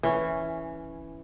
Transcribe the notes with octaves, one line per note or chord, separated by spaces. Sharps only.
E3 C#4